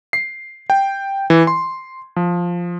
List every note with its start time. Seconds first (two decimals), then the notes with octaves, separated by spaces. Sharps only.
0.13 C7
0.70 G5
1.30 E3
1.47 C6
2.16 F3